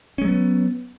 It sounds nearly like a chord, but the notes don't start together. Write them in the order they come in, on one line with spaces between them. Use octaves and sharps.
C#4 G#3 F#3 B3